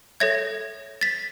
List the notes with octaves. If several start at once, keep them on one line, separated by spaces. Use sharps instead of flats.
A4 C#5 E5 G#6 A#6
A6 B6